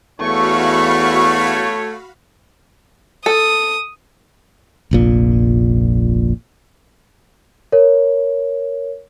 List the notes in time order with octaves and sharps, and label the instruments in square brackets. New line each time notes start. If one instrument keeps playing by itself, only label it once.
[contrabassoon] E2 [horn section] A3 C#5 [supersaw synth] F#4 F5 B5 [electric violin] C#6
[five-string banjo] A4 [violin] D#6
[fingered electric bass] F1 A#1 A#2
[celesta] A#4 C#5